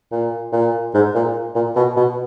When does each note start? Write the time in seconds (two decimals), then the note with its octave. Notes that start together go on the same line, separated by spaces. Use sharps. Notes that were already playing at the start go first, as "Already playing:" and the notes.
0.12 A#2
0.53 A#2
0.94 G#2
1.15 A#2
1.55 A#2
1.76 B2
1.97 B2